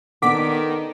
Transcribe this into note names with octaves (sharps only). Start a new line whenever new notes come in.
D#3 B3 D4 A4 F#5 D6 B6